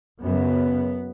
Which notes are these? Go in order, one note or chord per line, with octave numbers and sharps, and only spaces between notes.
F#2 C#3 B3